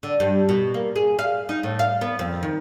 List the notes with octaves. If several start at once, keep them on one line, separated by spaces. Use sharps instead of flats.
D3
G2
B2
A#3
G#4
F5
D#4
A2
F5
B3
F2
D#3